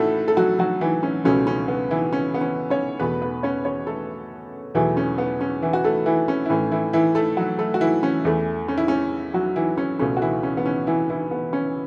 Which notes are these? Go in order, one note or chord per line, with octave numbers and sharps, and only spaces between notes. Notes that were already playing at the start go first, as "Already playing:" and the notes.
Already playing: A2 A3 C#4 E4 F#4 A4
A4
F#3 F#4
F#3 F#4
E3 E4
C#4
C#2 B2 F#3 A3 C#4
C#4
B3
E3 E4
C#4
B3
C#4
C#4 C#5
E2 B2 A3 B3 B4
B3 B4
C#4 C#5
C#4 C#5
A3 A4
E2 B2 E3 F#3 A3 E4
C#4
B3
C#4
E3 E4
F#4
A3 A4
E3 E4
C#4
E4
A2 E3 A3 C#4
E3 E4
E3 E4
A3 A4
F#3 F#4
A3 A4
F#4
E3 E4
C#4
E2 E3 A3
C#4
E4
C#4
F#3 F#4
E3 E4
C#4
C#2 B2 A3 C#4
F#4
E3 E4
C#4
B3
C#4
E3 E4
E3 E4
B3
C#4